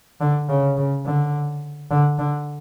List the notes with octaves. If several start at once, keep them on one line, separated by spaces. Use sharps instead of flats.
D3
C#3
C#3
D3
D3
D3